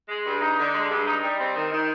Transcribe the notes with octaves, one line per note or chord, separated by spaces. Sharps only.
G#3
G2
D#4
D3
G#3
G2
D#4
G3
C4
D#3
D#3